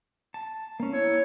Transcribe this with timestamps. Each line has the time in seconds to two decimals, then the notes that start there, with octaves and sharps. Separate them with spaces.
0.34 A5
0.80 A#3 C#4
0.93 E4 C#5